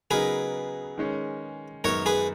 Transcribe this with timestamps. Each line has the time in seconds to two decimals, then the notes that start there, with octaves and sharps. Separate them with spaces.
0.11 C#3 F#3 B3 D#4 G#4 A#4 B4
0.98 D#3 G#3 C#4
1.84 F#2 D#3 G#3 B3 A#4 C#5
2.06 G#4 B4